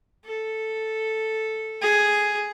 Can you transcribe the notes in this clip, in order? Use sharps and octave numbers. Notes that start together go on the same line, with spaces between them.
A4
G#4